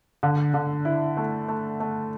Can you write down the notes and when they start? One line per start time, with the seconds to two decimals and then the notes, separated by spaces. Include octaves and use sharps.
0.23 D3
0.54 D3
0.85 E4
1.17 A3
1.48 A3
1.80 A3